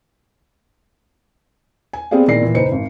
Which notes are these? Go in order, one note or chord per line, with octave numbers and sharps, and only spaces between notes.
G#5
B3 C4 G4 G#4 D5 F5
A#2 D#3 E4 D5 A#6 C7
A#2 E3
F#1 D#4 B4 C5 C#7
G#1